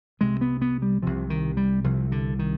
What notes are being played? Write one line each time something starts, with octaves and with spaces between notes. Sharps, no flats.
C2 C3 G#3
B3
B3
G3
C2 C3 F3
D#3
G3
C2 C3 F3
D3
D#3